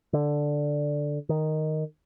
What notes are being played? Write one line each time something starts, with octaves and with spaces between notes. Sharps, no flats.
D3
D#3